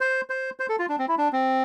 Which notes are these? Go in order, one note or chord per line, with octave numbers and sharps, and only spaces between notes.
C5
C5
C5
A4
F4
D4
C4
E4
D4
C4